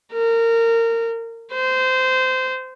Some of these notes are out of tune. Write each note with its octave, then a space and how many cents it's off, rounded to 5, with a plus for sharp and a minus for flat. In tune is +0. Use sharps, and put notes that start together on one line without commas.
A#4 -25
C5 -20